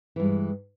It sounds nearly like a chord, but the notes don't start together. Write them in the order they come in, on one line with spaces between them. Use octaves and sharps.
E3 G2 G#3